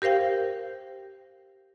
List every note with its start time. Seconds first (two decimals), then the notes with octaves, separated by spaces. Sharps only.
0.02 G4 A#4 C5 F5 G5